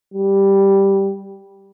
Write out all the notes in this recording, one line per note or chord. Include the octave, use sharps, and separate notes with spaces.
G3